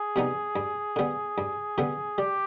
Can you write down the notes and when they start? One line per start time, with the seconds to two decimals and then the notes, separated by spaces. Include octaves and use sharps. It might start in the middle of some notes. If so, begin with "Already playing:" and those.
Already playing: G#4
0.16 C3 G3 B3 D#4
0.56 G2
0.96 D3 G3 B3
1.38 G2
1.78 D3 G3 B3
2.18 G3 G4